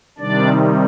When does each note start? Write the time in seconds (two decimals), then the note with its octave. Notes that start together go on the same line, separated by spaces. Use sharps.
0.18 C3 D#3 G3 D4 D5